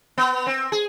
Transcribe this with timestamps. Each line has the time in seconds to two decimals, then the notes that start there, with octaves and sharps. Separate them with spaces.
0.18 B3
0.47 C4
0.72 G#4